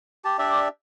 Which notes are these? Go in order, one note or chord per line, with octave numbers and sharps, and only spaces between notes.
G4 A5
D4 G4 D5 E5